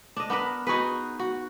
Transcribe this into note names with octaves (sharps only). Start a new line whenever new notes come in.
D4 D#5
B3 D4 A#4 B4
D#4 F#4 G#4 B4
F#4